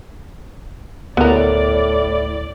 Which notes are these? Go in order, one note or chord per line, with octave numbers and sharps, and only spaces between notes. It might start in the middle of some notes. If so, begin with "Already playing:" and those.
D2 A2 B3 A#4 D5